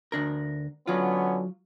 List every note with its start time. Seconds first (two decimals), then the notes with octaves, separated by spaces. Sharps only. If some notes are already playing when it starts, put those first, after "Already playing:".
0.12 D2 D4 A#4
0.87 D3 F#3 B3 C#4 F4